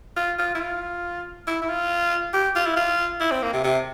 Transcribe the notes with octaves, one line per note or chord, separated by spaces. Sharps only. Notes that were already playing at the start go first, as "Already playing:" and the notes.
F4
F4
E4
F4
E4
E4
F4
G4
F4
E4
F4
E4
C4
A#3
C3
C3